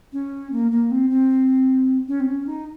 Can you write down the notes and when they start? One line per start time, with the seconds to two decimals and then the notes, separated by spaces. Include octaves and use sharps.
0.12 C#4
0.51 A#3
0.71 A#3
0.91 C4
1.10 C4
2.08 C#4
2.20 C4
2.27 C#4
2.46 D#4